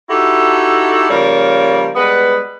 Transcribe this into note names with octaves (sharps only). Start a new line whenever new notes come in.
D#4 E4 F#4 G4 A4
C#3 F3 G3 A#3 A#4 C#5
G3 G#3 B3 B4